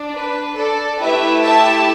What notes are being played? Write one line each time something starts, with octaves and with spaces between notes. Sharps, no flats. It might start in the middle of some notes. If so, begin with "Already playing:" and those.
Already playing: D4
B4
A4 D5
A3 E4 G4 B4 E5
E5 A5